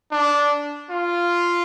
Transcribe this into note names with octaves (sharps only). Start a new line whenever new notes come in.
D4
F4